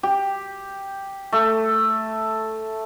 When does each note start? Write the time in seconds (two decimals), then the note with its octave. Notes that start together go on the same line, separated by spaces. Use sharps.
0.03 G4
1.32 A3